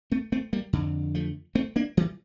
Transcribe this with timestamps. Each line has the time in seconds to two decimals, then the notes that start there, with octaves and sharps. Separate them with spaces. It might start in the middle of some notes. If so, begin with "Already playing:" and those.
0.12 A3 C4
0.32 A3 C4
0.53 G3 A#3
0.73 F2 D3
1.15 F3 A3
1.55 A3 C4
1.76 A#3 D4
1.97 E3 G3